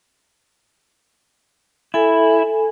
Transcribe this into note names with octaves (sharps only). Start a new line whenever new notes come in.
E4 A4 G#5